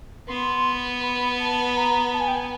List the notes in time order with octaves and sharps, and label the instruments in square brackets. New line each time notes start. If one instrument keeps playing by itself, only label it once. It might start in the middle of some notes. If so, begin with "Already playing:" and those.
[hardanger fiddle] B3 [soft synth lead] C6
[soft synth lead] B5
A5
A#5
A5
G#5
G5
G#5